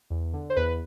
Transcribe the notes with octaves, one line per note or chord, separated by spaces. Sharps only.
E2
D3
C5
E2 B4